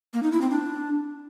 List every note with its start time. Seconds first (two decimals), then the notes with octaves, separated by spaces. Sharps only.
0.14 A#3
0.23 D#4
0.32 E4
0.41 C4
0.51 D4